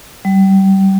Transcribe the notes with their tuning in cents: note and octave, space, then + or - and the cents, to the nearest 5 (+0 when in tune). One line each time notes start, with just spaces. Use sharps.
G3 -25